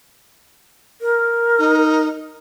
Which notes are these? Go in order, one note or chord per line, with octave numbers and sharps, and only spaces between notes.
A#4
D#4